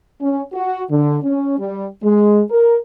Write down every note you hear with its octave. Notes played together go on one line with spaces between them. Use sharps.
C#4
F#4
D3
C#4
G3
G#3
A#4